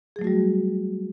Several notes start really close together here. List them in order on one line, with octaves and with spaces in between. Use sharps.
G#4 F#3 A3 F#4 G3